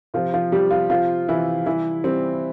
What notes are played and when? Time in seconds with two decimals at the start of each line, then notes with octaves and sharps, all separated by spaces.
0.14 C3 F3 F4
0.34 F3 F4
0.52 C3 G3 G4
0.71 F3 F4
0.90 C3 F3 F4
1.29 C3 E3 E4
1.66 E3 G3 E4
2.04 G3 C4